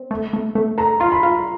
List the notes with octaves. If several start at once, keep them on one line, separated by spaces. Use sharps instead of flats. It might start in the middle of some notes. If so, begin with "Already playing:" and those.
Already playing: C4
A3
A3
A3
A4 A#5
F4 C6
B5
F4